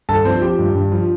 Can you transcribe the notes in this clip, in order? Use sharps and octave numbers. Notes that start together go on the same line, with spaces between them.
G2 A4 A5
F3 C4 C5
F3 G4
G2
G2
F3